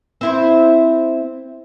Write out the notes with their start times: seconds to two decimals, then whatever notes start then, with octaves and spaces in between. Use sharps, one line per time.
0.21 C4 E4 C5